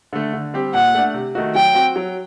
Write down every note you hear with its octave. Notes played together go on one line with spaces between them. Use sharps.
D3 A3
D3
G3 C4 G4
A#2 F#5
A3 D4
C3
D#3 A3 D#4 F#4
F#3 G5
C4 F#4
F#3